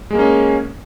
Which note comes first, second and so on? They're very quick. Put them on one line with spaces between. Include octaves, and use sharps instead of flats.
G#3 A#3 C#4